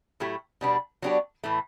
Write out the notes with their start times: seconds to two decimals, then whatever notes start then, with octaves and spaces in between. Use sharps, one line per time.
0.20 A2 F#3 A3 E4 G4
0.61 B2 G3 B3 D4
1.02 F#3 B3 D4 G4
1.43 A2 E3 A3